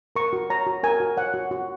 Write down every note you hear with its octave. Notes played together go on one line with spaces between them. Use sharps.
A#4 C#6
F#4
C#5 A#5
F#4
A#4 G#5
F#4
C#5 F#5
F#4
F#4